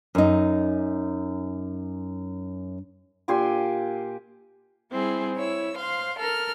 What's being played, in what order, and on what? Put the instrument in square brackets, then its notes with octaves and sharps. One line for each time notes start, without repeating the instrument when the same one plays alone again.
[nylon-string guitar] F#2 D#4
[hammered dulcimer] A#2 G4 G#5 C6
[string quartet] G3 C4 E4 G#4
E4 C#5 E6
C5 F5 C6
A4 A#4 F6